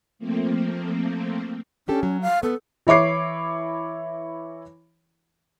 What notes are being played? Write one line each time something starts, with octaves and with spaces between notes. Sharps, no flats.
F3 A3 A#3 C4
C#4 D4 G4 A4
F#3
F5
B3 A4
E3 E4 C#5 D6 C7